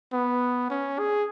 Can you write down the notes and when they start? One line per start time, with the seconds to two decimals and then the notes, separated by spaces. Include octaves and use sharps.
0.13 B3
0.70 C#4
0.99 G#4